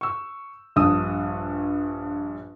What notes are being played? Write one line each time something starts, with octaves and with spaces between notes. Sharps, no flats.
C#6 E6
A#1 G2 D#6 E6